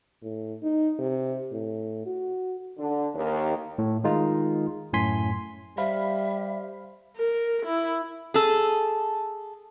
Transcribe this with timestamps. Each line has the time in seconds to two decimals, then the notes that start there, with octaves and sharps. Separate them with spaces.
0.23 A2
0.63 D#4
0.99 C3
1.52 A2
2.06 F#4
2.78 D3
3.14 D#2
3.78 A2
4.04 D#3 G#3 D#4 F4
4.93 F#2 A2 G#5 C6 B6
5.78 G3 C5 E5 F5 B5
7.16 A#4
7.66 E4
8.34 G#4 A4